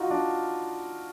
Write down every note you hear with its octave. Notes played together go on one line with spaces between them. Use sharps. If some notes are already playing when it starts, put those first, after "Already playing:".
Already playing: D#4 F4 F#4
D4